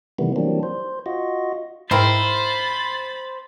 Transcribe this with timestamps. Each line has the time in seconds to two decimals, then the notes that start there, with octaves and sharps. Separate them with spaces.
0.19 C3 D#3 E3 G3 A3 B3
0.36 E3 F#3 G3 A#3 C4 D4
0.63 C5
1.06 F4 F#4 D#5
1.91 G#2 C4 E4 A#4 C5 B5 A6